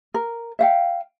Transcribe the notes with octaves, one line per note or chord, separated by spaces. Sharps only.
A#4
E5 F5 G5